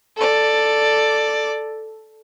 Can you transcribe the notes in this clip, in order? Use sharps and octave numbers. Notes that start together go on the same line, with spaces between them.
A4 D5